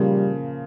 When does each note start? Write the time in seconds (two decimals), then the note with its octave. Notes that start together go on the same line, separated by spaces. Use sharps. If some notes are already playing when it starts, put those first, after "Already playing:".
Already playing: C#3 F3 G3 A#3